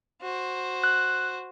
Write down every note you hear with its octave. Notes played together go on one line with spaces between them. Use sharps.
F#4 C5
F#6